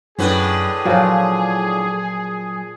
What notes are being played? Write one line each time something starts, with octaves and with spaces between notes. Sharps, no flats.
F#2 A2 D3 G#4 B4
A#2 F3 F#3 F#4